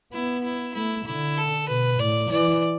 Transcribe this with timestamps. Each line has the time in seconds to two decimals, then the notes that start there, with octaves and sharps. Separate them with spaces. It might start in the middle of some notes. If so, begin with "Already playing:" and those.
0.13 B3 E4
0.44 E4
0.74 A3 E4
1.06 D3 E4
1.37 A4
1.68 B2 B4
1.99 A2 D5
2.31 E3 D5